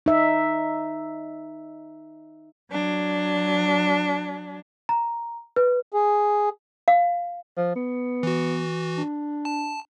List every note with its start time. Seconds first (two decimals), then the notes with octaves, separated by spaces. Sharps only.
0.06 D#4 E5
2.71 F#3 D4
4.89 A#5
5.56 B4
5.93 G#4
6.88 F5
7.57 F3
7.75 B3
8.23 E3 F#4
8.98 D4
9.45 A5